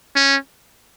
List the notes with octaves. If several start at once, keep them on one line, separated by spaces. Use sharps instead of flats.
C#4